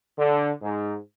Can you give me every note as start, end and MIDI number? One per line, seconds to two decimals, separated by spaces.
0.17 0.50 50
0.62 0.95 44